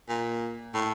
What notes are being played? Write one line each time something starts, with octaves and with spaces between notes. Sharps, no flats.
A#2
A2